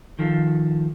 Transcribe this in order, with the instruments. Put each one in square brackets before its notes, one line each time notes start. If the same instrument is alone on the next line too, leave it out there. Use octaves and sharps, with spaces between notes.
[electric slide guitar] D#3 F3 A4